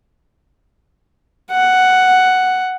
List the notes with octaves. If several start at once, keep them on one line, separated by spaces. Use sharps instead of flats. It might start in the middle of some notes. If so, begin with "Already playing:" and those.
F#5